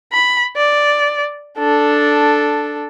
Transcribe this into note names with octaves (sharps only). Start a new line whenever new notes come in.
B5
D5
D4 A4